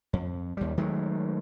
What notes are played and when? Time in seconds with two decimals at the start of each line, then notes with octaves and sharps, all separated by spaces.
0.13 F2
0.57 D#2 G3
0.77 D#3 F#3 G#3 A3